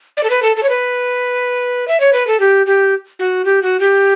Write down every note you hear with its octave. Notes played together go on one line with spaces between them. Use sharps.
D5
A4
B4
A4
A4
C#5
B4
E5
C#5
B4
A4
G4
G4
F#4
G4
F#4
G4